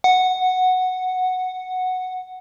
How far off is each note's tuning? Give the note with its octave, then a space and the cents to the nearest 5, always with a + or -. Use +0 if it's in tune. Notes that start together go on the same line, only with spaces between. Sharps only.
F#5 -5